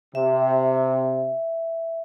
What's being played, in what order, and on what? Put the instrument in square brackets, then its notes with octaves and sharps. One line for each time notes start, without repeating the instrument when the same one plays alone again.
[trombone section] C3 [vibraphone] E5